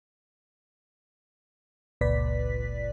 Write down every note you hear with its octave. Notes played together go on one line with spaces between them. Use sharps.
G1 C#2 A#2 B4 D5 B6